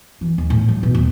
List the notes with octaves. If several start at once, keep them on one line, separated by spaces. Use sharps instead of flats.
E3
D#2
A2
G3
B2
D#1